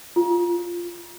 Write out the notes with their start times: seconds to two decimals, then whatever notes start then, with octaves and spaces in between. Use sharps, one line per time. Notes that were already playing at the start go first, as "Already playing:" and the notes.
0.16 F4